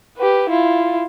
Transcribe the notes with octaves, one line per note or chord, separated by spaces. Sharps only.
G4 B4
E4 F4